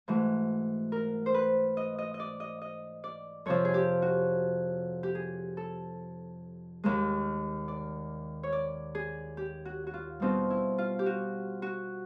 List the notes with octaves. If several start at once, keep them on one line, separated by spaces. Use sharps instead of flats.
G#2 E3 A3 F#4
A#4
C5
B4
D#5
D#5
D#5
D5
D#5
D#5
D5
F2 C3 F3 C#5
G#4
G4
F#4
G4
G#4
A4
D#2 D#3 G#3
D5
C#5
D5
G#4
G4
F#4
F#4
F4
B2 G3 C4 D#4 F4
E4
F4
G4
F#4
F#4